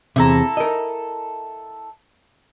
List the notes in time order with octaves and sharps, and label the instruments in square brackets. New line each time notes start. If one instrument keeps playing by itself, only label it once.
[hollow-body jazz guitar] E2 C3 [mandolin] E4 A4 A#5
[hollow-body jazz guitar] A#4 D#5